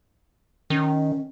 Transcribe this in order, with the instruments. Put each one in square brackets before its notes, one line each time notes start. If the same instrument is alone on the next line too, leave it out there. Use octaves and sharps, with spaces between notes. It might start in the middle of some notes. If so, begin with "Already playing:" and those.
[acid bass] D#3 [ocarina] C#4